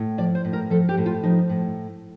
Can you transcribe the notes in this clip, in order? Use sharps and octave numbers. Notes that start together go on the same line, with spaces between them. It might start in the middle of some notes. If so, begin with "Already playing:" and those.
Already playing: A2
F3 D5
C5
A2
A#4
F3 A4
G4
A2
F4
F3 D#4
A2